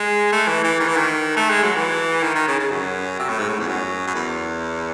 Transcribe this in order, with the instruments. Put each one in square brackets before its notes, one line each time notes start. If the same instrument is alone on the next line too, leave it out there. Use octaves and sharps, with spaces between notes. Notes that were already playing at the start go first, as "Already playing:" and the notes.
Already playing: [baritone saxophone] G#3
A3
E3
E3
D#3
E3
D#3
A3
G#3
F#3
E3
D#3
D#3
C#3
C#3
F#2
C3
A2
G#2
A2
E2
F#2
F#2
E2